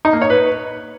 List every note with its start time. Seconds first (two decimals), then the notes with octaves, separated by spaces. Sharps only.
0.05 D#4
0.13 A#3
0.22 C#5
0.30 B4